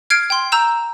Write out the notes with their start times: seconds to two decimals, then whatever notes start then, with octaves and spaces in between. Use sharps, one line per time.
0.10 F6 G#6 C7 D7
0.30 G5 C6
0.52 A#5 E6 G6 E7